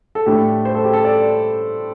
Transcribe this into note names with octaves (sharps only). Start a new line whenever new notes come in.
A4
A2 A3 D4 G4
C5
A4
G4
A4
D5